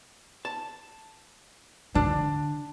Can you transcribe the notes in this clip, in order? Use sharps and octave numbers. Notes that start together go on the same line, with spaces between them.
A5
D3 D4